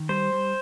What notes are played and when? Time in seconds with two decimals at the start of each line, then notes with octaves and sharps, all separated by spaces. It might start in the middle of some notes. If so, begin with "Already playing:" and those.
Already playing: D#3
0.09 G3 C5
0.33 G3